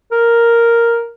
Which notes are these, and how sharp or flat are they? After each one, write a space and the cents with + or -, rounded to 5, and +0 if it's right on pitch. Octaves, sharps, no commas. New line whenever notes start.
A#4 +0